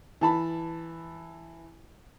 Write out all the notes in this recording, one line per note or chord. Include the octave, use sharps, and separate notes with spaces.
E3 A5 B5